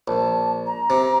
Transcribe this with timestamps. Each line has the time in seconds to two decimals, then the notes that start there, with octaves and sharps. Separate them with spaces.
0.08 A#1 A5
0.65 A#5
0.90 C3